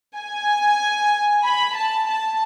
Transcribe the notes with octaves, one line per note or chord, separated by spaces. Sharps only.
G#5
B5
A5
A5